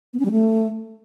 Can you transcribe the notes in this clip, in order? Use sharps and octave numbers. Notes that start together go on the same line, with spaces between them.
B3
C#4
G3
A3